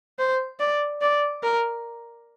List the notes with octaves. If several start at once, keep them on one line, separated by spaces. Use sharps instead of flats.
C5
D5
D5
A#4